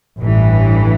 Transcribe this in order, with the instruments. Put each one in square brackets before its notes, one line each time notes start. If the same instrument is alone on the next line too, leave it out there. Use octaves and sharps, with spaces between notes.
[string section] A1 G2 E3